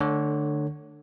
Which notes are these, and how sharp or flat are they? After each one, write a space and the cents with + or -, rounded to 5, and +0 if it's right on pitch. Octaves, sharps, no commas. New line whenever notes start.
D3 +20 A3 +0 C#5 +0